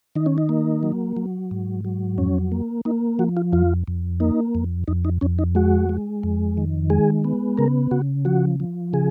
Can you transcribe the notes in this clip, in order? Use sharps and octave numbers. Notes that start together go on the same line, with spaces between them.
D#3 D#4
C#4
D#4
A#3
F#3
F#3
G#2
F#3
F2 C#4
A#3
A#3 D#4
F3 F#4
F4
F2 F4
F2
A#3 D#4
F2
F2 D#4
D#4
F2 C#4
D#4
G#3 F#4
G#3
F2
D#3
G#3 G#4
B3
C#3 A#4
C#3 F#4
F3 F#4
F3
C#3 G#4